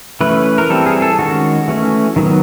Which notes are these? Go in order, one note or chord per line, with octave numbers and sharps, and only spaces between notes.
E3 A3 C#4 B4
A#4
E3 G3 C4 A4
G#4
A4
D#3 G#3 C#4 F#4
E3 A3 C#4
D#3 F#3 B3